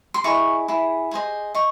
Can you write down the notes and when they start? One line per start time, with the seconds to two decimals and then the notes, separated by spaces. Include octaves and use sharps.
0.14 C6
0.24 E4 G#4 D#5 C#6
0.68 E4 G#4
1.11 G#4 C5 D#5
1.55 D#5 C#6